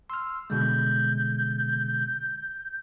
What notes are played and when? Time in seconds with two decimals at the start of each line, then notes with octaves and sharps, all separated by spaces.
0.10 C6 E6 F6
0.50 B2 D3 G#3 G6